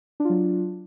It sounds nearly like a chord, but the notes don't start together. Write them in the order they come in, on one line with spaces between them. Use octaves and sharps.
D4 F4 F#3